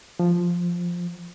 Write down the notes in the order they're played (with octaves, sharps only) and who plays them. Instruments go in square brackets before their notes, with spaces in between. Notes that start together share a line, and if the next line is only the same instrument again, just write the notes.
[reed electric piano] F3